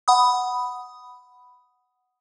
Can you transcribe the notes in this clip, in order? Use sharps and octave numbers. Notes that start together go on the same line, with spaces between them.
F#5 B5 D#6